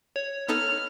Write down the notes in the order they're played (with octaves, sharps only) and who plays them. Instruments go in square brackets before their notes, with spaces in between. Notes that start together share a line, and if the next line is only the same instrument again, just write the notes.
[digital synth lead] C#5
[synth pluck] B3 D#4 A4 [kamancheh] F6